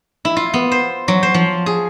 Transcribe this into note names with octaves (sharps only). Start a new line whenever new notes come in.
E4
F4
B3
C5
F#3
C5
F3
G#4